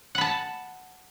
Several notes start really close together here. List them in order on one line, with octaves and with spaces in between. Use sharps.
F#5 B5 A5